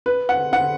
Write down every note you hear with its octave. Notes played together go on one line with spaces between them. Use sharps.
B4
F#5
F#5